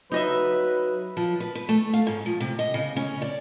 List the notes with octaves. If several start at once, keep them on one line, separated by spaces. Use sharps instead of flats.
F#3 D#4 B4 D#5 E5
F3
B4
B4
A3
F5
G#2
F3
C3
D#5
C#3
C#4
D5